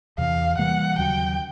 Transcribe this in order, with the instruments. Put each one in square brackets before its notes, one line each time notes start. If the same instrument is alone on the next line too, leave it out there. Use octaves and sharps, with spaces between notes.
[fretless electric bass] E2 C3 E3 [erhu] F5
[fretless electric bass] C3 E3 G3 A#3 [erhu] F#5
[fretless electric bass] D#2 C#3 F#3 [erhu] G5